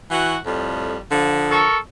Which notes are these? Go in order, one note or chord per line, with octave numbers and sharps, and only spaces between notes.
E3 F#4
F2 A2 G3
D3 F3
A4 A#4 C#6